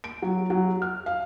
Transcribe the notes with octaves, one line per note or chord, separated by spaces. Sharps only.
D7
F#3
F#3
F6
F5